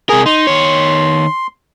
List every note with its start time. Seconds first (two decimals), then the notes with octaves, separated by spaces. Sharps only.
0.09 C3 G#4 A#4
0.26 D#4 C6
0.47 D#3 C#5